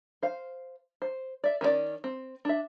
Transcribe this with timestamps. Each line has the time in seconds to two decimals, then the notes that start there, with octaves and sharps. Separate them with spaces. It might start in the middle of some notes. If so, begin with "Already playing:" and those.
0.23 C5 F5
1.02 C5
1.44 D5 E5
1.61 D#3 C#4 F4 D5
2.04 C4
2.45 D4 E5